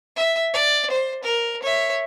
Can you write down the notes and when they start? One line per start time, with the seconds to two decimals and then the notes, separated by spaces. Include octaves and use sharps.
0.16 E5
0.53 D5
0.91 C5
1.23 A#4
1.63 C#5 E5